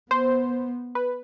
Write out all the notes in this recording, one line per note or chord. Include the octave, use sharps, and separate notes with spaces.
B3 C5
B4